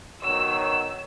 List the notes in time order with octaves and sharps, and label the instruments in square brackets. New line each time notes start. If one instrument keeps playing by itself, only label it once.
[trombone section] B2 D#3 F#3 [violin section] E6